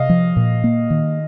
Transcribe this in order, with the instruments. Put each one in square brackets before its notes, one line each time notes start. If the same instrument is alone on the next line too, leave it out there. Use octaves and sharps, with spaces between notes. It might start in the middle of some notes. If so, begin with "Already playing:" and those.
Already playing: [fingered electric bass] C3 [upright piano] D#5 F5
[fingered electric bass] F3
A#2
A#3
D#3